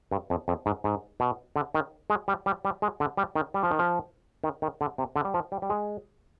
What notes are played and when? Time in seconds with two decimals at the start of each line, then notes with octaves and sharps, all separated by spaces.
0.11 G2
0.30 F2
0.48 F2
0.66 G#2
0.84 G#2
1.20 B2
1.56 D3
1.75 D#3
2.10 G#3
2.28 G3
2.46 G3
2.65 G3
2.82 G#3
3.00 D3
3.17 G3
3.35 D#3
3.54 G3
3.63 F3
3.71 D#3
3.79 F3
4.44 D#3
4.62 D#3
4.81 D3
4.98 C3
5.16 D3
5.25 G3
5.34 F3
5.52 G3
5.62 G3
5.70 G#3